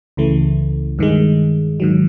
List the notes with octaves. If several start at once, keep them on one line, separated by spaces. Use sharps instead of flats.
C#2 C#3 E3 A3
G2 D#3 G#3
G#2 D#3 F#3